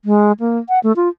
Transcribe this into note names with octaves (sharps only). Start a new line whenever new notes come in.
G#3
A#3
F#5
A3
F4